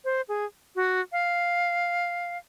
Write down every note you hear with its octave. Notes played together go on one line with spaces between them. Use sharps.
C5
G#4
F#4
F5